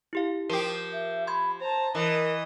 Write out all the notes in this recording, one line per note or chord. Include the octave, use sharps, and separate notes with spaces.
E4 G4 F5
F3 G4 A#4
E5
B5 C6 G#6
C5 A5 A#5
E3 A#4 D#5